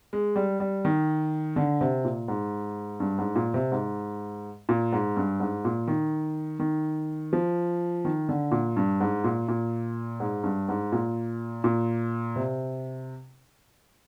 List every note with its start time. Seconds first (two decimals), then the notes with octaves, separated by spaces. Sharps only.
0.13 G#3
0.36 G3
0.60 G3
0.85 D#3
1.56 D3
1.81 C3
2.05 A#2
2.28 G#2
3.00 G2
3.18 G#2
3.36 A#2
3.54 C3
3.72 G#2
4.69 A#2
4.92 G#2
5.17 G2
5.40 G#2
5.65 A#2
5.88 D#3
6.59 D#3
7.33 F3
8.05 D#3
8.29 D3
8.51 A#2
8.77 G2
9.00 G#2
9.24 A#2
9.48 A#2
10.20 G#2
10.44 G2
10.69 G#2
10.92 A#2
11.64 A#2
12.36 C3